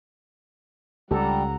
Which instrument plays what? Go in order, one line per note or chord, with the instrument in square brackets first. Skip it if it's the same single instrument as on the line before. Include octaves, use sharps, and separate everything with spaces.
[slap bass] C#2 [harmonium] G3 [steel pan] G4 A4 [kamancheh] F#5 A#5